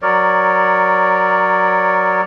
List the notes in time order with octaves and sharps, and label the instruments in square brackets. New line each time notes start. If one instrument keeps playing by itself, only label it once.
[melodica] F#3 A#4 C#5 D5